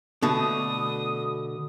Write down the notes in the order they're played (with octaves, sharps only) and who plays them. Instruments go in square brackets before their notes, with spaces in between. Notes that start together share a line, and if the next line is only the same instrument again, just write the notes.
[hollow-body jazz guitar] B2 D3 A3 [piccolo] D#6